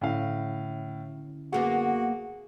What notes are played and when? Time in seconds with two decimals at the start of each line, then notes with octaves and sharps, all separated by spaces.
0.01 A2 D3 C#4 E4 F5
1.53 F#2 A#3 B3 F#4 G#4